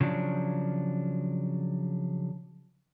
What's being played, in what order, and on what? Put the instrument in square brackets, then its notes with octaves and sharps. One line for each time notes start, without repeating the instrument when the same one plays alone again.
[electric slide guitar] C#3 F3 F#3 D4